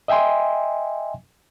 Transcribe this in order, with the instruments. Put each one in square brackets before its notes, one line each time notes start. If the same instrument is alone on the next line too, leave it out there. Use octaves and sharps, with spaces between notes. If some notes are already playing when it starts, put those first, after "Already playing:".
[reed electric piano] D#5 E5 G5 G#5 C6